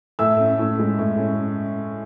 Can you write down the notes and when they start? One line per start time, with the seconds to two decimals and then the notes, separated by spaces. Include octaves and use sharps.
0.19 A2 E5 E6
0.40 C#4
0.59 A2
0.79 G#3
0.99 A2
1.18 C#4